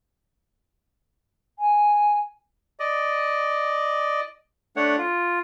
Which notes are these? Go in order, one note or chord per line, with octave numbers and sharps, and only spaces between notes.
G#5
D5 D#5
A3 D4 C#5 F#5
F4